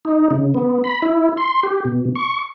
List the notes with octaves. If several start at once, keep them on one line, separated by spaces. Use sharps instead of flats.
D#4
C#3
B3
B5
E4
C6
G4
B2
C#6